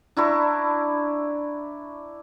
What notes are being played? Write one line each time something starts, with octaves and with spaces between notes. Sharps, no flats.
D4 E4 A#5 C#6